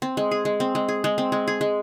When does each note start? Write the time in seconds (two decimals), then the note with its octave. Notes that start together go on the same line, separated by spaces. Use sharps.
0.02 C4
0.17 G#3
0.31 G#4
0.45 G#3
0.60 C4
0.75 G#3
0.89 G#4
1.04 G#3
1.18 C4
1.32 G#3
1.48 G#4
1.61 G#3